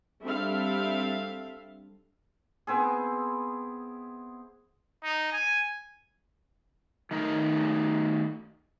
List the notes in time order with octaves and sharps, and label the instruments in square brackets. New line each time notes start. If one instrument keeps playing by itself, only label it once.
[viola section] G3 C4 D4 A4 E5 F5
[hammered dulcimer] B3 C4 E4 G#4
[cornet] D#4
G#5
[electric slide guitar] D#3 A3 D#4 A#4